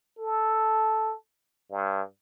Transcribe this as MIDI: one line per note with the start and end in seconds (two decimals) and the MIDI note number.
0.18 1.12 69
1.71 2.01 43